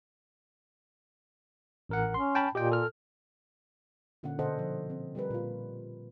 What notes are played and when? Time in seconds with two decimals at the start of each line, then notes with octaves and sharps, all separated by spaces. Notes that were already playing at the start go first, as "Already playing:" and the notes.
1.89 A1 A#4 F#5
2.14 C#4 C6
2.35 G5 A5 B5
2.55 A#2 G4 D#5 G5
2.72 A4 F6
4.23 A#2 D3 A#3 C#4 F#5
4.39 B2 D3 A4 C5 D#5 F#5
4.59 F3
4.90 C4
5.15 G3 G4 A#4 B4
5.31 A#2 F4